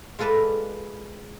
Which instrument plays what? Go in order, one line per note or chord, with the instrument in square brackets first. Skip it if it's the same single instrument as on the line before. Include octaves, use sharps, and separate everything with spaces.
[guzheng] G#3 F4 A4 B4 D5 E5